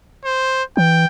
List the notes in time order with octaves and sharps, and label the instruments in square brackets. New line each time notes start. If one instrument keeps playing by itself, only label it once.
[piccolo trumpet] C5
[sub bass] E3 [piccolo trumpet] G5